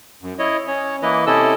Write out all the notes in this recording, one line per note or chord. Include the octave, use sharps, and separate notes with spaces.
F#2
E4 C#5 D#5
C#4 C#5
E3 A#3 E4 B4 D#5
C3 C#4 E4 A4 D#5 E6